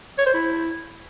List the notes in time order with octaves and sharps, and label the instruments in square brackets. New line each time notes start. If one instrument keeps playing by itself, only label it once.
[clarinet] C#5
C5
E4